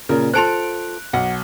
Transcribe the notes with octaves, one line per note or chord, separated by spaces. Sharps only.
A#2 C#3 A#4
F4 A4 C5 F#6 D7 F7
B1 F#5